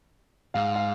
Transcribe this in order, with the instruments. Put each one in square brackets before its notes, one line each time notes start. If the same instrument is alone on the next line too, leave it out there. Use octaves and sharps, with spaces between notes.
[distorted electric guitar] G#2 [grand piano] F5
[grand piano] F5